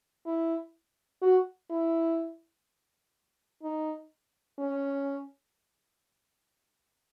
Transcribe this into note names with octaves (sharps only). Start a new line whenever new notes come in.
E4
F#4
E4
D#4
C#4